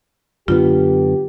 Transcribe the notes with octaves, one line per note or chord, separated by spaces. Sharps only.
F#2 D3 B3 F4 G4